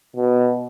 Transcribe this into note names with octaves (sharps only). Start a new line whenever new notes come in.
B2